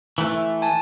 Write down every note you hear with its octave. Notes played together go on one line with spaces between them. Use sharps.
E3 A3
G#5 A5